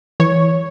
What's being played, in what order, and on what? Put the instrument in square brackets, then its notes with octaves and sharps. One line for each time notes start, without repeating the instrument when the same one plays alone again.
[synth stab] E3 C#5